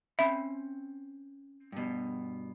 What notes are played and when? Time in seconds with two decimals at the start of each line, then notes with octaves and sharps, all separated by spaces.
0.19 C4 C#4 E5 B5
1.72 G2 B2